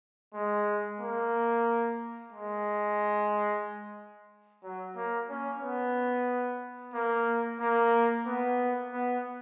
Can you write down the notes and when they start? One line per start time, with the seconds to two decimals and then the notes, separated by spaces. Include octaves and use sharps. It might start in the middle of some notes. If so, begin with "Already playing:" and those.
0.34 G#3
1.00 A#3
2.32 G#3
4.63 F#3
4.96 A#3
5.29 C#4
5.62 B3
6.94 A#3
7.60 A#3
8.26 B3
8.92 B3